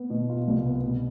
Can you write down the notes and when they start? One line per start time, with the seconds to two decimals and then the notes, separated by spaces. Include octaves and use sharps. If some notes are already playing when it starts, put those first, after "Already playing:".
Already playing: B3
0.10 B2
0.29 F4
0.48 C2
0.66 B3
0.83 B2